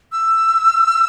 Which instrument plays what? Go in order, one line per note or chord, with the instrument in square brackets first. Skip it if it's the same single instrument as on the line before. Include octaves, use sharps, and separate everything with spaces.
[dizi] E6